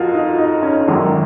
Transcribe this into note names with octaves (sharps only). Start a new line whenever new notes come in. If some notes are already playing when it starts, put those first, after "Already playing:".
Already playing: F2 F3 F4 F#4 A#4
D#4
D#4
C#4
C#4
G#1 F#2 D#3 D#4